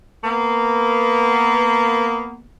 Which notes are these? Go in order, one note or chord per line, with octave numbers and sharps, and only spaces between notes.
A#3 B3